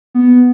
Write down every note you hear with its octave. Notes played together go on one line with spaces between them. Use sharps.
B3